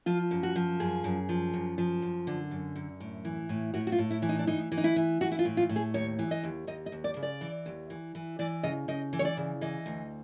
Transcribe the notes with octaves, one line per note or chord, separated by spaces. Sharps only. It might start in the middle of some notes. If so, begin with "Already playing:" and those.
F3 F4
F#2
F#4
F3
F#2 G#4
F#2
F3
F#2
F3
F#2
D3
F#2
F#2
A2
E3
A2
A2 F#4
F#4
F4
A2
E4
E3
D#4
D4
E3 D#4
E3
D#4
E4
E3
E3 F#4
E4
F4
A2
F4
A2
G#4
D#2 C#5
E3
D#5
D#2
D#2 D#5
D#5
D#2
D5
C#3
D5
E3
D#2
E3
E3
E3 D5
C#3 D#5
C#3 D#5
E3
C#5
D5
C#3
E3 D#5
D2